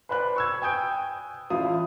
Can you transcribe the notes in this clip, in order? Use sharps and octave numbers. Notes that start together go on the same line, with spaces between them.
B4 C5 D5 B5 F#6
C#6 E6 G#6
G5 G#5 D#6 G6 D7
A1 E4 F4 F5 D#6